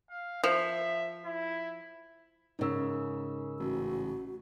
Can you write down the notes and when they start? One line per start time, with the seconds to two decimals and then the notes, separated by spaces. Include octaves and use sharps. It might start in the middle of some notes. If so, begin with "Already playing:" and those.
0.10 F5
0.44 F3 E5
1.25 E4
2.59 G#2 C#3 D#4 A#4 E6
3.59 A1 F#4